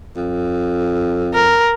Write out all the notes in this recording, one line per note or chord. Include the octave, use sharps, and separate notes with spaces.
F2
A#4